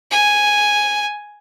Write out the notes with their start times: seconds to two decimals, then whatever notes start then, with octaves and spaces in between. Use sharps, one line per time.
0.11 G#5